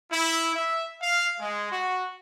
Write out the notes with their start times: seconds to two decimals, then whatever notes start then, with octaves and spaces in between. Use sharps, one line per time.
0.12 E4
0.54 E5
1.00 F5
1.40 G#3
1.72 F#4